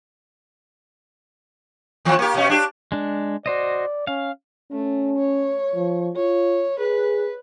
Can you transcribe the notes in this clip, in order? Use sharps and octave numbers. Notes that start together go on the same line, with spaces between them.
D#2 F3
A#3 G4
B2 C#4
D4 G4
G#3 D4
F#4 C5 D5 D#5
C#4 F5
A3 C#4
C#5
F3
F4 C#5
G#4 B4